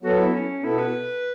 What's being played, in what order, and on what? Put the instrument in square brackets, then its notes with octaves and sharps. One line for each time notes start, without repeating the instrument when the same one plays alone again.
[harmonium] F#3 B3 A4 [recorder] F#4
[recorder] E4
C#4
[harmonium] B2 B3 A4 [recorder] E4
[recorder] B4